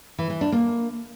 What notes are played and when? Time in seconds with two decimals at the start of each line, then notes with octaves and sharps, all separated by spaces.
0.18 E3
0.30 E3
0.41 D4
0.52 A#3